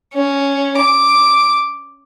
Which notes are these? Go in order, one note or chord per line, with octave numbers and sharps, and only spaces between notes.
C#4
D6